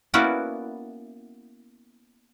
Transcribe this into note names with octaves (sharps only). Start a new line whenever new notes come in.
A#3 B3 C#4 E4 F#4 D5